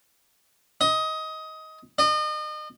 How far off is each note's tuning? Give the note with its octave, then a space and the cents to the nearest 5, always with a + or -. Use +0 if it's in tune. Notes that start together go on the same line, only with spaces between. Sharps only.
D#5 +20
D#5 -35